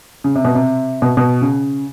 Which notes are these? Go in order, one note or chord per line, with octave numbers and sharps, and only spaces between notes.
C#3
C3
B2
C3
B2
B2
C#3